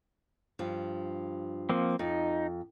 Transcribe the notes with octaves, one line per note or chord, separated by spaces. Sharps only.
G2 F3
F3 A#3 C4
F2 D#4